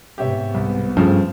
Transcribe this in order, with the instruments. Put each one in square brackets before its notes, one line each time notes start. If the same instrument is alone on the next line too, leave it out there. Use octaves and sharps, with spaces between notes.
[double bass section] G#2 C3 B3 [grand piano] G4 C#5 E5
[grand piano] C2
[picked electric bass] G2 C#3 [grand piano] F3 A3